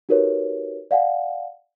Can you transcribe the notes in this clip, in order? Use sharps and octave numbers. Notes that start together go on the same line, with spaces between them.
D#4 F#4 G4 A#4 B4 C#5
D5 F5 F#5 G#5